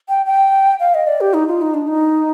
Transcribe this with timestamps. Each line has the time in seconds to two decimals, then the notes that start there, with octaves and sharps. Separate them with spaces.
0.09 G5
0.26 G5
0.80 F5
0.94 D#5
1.07 D5
1.21 G4
1.34 D#4
1.48 F4
1.62 D#4
1.74 D4
1.88 D#4